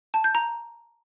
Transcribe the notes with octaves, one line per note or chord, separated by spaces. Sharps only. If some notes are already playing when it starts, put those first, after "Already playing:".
A5
G6
A#5